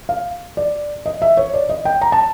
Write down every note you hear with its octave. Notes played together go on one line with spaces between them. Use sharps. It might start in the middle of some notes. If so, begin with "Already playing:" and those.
F5
D5
D#5
E5
C#5
D5
D#5
G5
A#5
A5